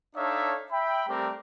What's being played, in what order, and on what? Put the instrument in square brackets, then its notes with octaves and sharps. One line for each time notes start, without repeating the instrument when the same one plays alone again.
[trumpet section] D4 D#4 A4 C#5 E5 F5
E5 G5 B5
G3 A3 C4 G4 A#4 D5